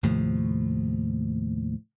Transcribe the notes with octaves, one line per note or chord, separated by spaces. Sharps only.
D#2 A2 C3 F3